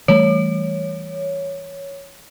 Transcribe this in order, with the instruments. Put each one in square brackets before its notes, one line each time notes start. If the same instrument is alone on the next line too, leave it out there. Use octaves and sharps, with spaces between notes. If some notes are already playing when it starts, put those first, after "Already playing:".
[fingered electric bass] E3 G3 A3 [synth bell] C#5